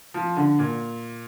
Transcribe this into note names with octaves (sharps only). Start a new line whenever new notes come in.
F3
D3
A#2